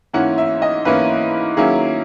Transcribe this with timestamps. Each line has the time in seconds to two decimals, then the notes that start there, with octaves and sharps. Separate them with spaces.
0.13 G#2 E3 A#3 C#4 E4 F#5
0.38 E5
0.62 D#5
0.85 G#2 E3 A#3 C#4 E4 B4
1.57 D#3 F#3 A#3 C#4 E4 G#4